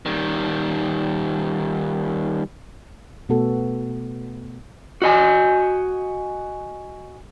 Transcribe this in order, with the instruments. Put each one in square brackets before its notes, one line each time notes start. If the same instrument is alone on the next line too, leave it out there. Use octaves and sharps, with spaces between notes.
[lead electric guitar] D#3 G3
[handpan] B2 A3 B3 F#4 A4
[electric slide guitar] F#4 D#5 G#5